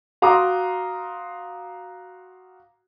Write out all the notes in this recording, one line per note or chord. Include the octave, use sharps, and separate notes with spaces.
F#4 F5 A#5 C6 D6 D#6